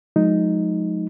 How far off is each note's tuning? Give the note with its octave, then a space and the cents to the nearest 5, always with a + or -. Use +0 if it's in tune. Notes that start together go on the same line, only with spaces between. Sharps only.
F3 +45 G#3 +30 D#4 +0